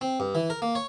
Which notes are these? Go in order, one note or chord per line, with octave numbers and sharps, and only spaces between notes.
C4
G2
E3
A#4
A#3
C#5